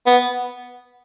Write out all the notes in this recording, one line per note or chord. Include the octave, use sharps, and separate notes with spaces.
B3